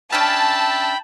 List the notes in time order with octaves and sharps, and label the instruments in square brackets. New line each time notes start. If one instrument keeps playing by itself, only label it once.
[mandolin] C#4 D4 E5 [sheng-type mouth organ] G5 B5 [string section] A5